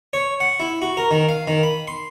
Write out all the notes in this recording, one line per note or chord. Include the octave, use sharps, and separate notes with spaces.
C#5
F#5
E4
F#4
A#4
D#3
F5
D#3
B5
C6